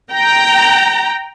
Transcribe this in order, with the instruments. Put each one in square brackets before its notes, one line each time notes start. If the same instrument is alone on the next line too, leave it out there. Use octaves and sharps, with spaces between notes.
[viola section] G5 A#5